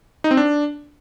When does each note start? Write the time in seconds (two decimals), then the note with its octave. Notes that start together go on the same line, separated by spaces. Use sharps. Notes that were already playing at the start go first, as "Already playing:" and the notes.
0.24 D#4
0.31 C4
0.37 D4